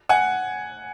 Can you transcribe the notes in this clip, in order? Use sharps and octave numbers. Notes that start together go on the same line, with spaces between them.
F#5 G#5